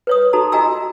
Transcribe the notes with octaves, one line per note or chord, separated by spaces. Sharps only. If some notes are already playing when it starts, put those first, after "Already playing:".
B4 C#5 D#6
D#4 F#4 A4 A#5
F4 F#4 D#5 G#5 A#5 E6